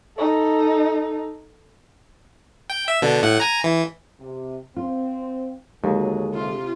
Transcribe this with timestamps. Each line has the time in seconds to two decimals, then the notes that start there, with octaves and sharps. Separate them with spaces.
0.18 D#4 A4
2.70 G5
2.88 E5
3.02 B2 D3
3.23 A2 F#5
3.40 G#5 A#5
3.64 E3
4.20 C3
4.77 C4 F4
5.84 D#2 D3 F#3 G#3 G#4
6.34 C3 F4